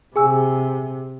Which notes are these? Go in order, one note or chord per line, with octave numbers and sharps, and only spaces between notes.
C3 G#4 G#5 E6